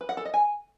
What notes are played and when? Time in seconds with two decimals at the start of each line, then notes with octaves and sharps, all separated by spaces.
0.01 B4
0.09 F#5
0.17 A4
0.25 D#5
0.34 G#5